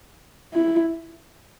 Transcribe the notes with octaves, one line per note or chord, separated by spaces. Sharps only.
E4